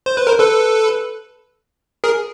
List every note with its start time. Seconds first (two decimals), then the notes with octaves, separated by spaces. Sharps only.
0.06 C5
0.17 B4
0.27 A#4 C5
0.39 A4 B4
2.04 G#4 A#4